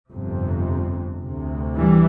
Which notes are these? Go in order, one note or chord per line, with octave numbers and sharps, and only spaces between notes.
G1 F2 C3
D2 C3
E3 G3